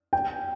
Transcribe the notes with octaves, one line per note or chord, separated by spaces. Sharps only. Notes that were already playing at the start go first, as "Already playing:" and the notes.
G5